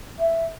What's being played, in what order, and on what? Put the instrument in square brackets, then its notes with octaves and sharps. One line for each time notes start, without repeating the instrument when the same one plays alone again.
[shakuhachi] E5